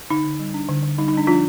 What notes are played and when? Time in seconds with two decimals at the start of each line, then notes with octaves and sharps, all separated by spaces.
0.10 D3 D#4
0.25 D3
0.39 G3
0.54 D4
0.69 D3
0.83 D3
0.98 G3 D#4
1.08 D#4
1.13 G3 D4
1.27 F3 D4 F4